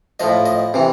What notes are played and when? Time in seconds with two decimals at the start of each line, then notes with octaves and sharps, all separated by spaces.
0.20 A2 F3 D#5
0.46 D#5
0.74 C3 E3